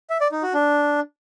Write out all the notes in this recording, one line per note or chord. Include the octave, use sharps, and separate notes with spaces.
E5
D5
D#4
F#4
D4